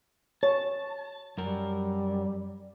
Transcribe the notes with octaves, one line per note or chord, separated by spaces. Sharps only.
C#5 A5
F#2 G3 A#4